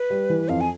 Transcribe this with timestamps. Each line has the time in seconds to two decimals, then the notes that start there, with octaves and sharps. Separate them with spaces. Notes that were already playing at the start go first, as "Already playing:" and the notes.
Already playing: B4
0.10 G3
0.30 E3
0.49 F2 F5
0.61 G#5